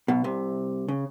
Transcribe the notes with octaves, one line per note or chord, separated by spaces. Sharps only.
B1 B2
C2 C3
C#3